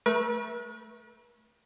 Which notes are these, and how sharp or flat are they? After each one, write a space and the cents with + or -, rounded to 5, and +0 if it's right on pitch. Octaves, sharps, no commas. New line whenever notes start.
A3 +0 B4 -45